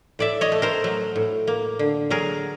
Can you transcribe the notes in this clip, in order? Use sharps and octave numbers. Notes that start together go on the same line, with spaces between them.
A2 D5 E5
C#5 D#5
A3
A#4 C5
F#3
A2
A#3
D3
F#3 G#4 A#4